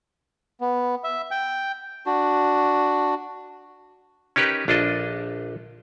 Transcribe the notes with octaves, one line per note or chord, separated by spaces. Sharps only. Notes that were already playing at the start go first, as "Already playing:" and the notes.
B3
E5
G5
D4 F#4
C#4 D#4 G4 A#4 B4
A#1 D4 F4 A4 D#5